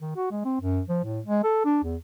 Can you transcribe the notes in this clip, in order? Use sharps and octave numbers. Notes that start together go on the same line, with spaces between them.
D#3
F#4
G#3
C4
F#2
F3
A2
G#3
A4
D4
E2